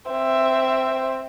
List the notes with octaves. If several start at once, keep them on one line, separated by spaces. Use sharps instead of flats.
C4 E5